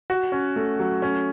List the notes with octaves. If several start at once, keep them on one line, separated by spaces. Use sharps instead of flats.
F#4
C#4
A3
F#3
C#4